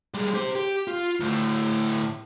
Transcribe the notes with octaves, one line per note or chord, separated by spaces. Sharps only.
G3 G#3
G4 C5
G4
F4
D2 A2